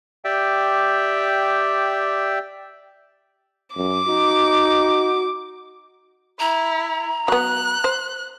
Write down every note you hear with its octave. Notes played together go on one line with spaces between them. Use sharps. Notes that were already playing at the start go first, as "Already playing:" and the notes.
G4 D5 E5 G5
F#2 D6
D#4 F#4
E4 A#5
F#3 B3 F#6
C5